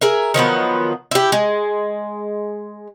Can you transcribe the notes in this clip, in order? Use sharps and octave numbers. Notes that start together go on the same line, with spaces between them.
G#4 A#4 E5
D#3 F3 F#3 B3
E4 G4
G#3